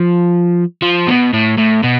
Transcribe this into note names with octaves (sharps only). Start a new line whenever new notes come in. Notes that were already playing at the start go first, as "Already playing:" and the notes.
Already playing: F3
F3
B2
A2
A2
B2